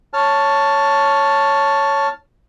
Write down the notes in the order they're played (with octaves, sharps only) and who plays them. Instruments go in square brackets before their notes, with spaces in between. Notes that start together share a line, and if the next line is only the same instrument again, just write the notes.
[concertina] C#5 A5 F6